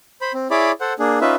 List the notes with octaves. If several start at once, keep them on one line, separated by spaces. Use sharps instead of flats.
C5 B5
C4
E4 G#4 C#5 D5 B5 D6
A4 C5 F#5
A#3 D4 G#4
C#4 D#4 F4 B4 E5